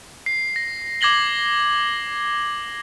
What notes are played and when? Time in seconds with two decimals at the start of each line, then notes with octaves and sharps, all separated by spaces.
0.26 C7
0.56 A#6
1.01 D6 G#6 A#6 F#7 G7